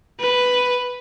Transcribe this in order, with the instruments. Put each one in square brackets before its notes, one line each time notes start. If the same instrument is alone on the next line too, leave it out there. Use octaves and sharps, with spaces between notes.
[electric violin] B4